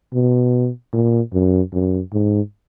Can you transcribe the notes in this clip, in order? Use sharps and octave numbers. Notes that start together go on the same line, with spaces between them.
B2
A#2
F#2
F#2
G#2